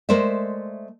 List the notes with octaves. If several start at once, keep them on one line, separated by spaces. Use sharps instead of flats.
G#3 A3 A#4 C5 D5 E5